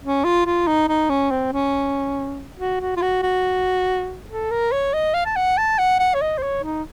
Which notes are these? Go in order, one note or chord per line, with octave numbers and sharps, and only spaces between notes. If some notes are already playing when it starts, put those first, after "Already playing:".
C#4
F4
F4
D#4
D#4
C#4
C4
C#4
F#4
F#4
F4
F#4
F#4
A4
A#4
C#5
D#5
F5
A5
F#5
A5
F#5
F#5
C#5
D#5
C5
C#5
D#4